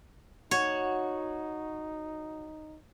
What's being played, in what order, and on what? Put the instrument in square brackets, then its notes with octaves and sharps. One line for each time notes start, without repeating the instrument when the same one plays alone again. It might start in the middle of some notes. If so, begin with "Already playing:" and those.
[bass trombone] D#4 [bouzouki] F#4 [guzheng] C#5